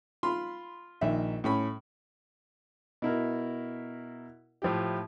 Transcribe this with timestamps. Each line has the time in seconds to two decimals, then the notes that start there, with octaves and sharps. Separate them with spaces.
0.23 F4 B5 C6
1.01 A#1 D#3 D#4 E5
1.44 A2 C#4 B5
3.02 B2 E4 A#4
4.62 A2 F3 E4 G4